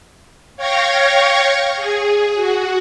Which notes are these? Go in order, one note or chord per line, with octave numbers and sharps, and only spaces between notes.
C#5 F5 G5 C#6 G#6 A#6
G#4
F#4